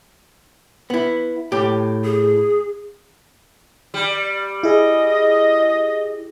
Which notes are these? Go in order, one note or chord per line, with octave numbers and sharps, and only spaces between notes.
B3 E4
A2 G4
G#4
G3
E4 G#4 D#5